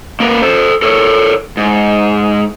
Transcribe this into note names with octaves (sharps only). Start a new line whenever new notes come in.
A#3 B3 A#4 B4
A4 C5
A4 A#4 C#5
G#2